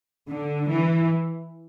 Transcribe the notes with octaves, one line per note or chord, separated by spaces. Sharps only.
D3
E3